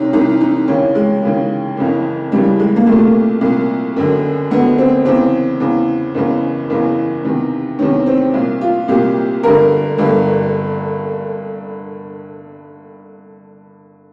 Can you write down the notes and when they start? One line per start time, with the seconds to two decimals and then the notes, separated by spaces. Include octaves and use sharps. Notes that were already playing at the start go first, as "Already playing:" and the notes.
Already playing: C2 C3 C#4 D#4
0.13 C2 C3 E3 D#4
0.41 D#4
0.68 D#2 C#3 E3 C#4
0.95 G#3
1.23 D#2 C#3 E3
1.77 F#1 F2 C#3 E3
2.32 F#1 F2 C#3 E3 G3
2.59 G#3
2.76 A#3
2.86 C2 A#2 A3
3.41 C2 A#2
3.96 F#1 F#2 D3
4.50 F#1 F#2 D3 B3
4.78 C4
5.05 E2 C#3 E3 C4
5.60 E2 C#3 E3
6.14 F#1 E2 C#3 E3
6.70 F#1 E2 C#3 E3
7.24 E2 C3 D#3
7.79 E2 C3 D#3 C#4
8.06 C4
8.34 C2 A#2
8.61 F4
8.88 C2 A#2 G4
9.43 G1 G2 D3 A#4
9.98 G1 G2 D3